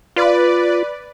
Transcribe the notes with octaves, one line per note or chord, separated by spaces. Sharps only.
F4 B4 D5